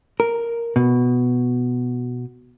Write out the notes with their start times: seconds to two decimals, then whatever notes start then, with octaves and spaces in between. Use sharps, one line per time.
0.20 A#4
0.76 B2